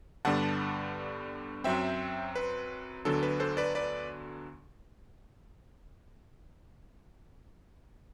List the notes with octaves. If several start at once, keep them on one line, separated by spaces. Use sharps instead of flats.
G2 D3 G3 B3 D4 F#5 A5
F#2 F#3 C4 E5 G5
B4
D2 D3 F#3 B3 D4 A4
B4
A4 C5
B4 D5
B4 D5